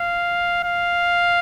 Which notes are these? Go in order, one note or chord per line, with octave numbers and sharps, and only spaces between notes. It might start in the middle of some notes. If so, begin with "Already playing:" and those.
Already playing: F5
F5